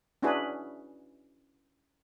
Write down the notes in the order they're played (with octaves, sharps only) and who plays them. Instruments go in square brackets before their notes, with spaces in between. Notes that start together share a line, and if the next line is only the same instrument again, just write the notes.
[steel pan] C#4 D4 E4 F#4 G#4 B4